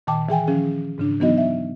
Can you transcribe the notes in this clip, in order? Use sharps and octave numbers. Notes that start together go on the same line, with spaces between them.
A#2 D#3 G5 A5 D6
E3 G#4 G5 G#5
D#3 F3 C#4 G#4
G#2 C#3 D4
E3 F#3 B3 D#4 F#4 D#5
E5